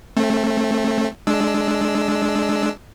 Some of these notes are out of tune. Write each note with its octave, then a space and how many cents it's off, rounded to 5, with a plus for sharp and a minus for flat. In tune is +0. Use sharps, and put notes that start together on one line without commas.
A3 +0 C4 +35
G#3 +15 D4 +0 E6 +0